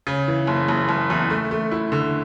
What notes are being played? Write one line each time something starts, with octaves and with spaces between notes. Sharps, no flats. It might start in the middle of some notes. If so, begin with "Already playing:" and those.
C#3
E3
F#1
F#1
F#1
E2
A3
A3
E4
D3